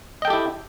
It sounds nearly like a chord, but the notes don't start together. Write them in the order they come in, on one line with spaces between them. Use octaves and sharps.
D#5 G5 A4 G4 E4